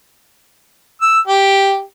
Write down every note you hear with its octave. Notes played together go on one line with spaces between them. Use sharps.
E6
G4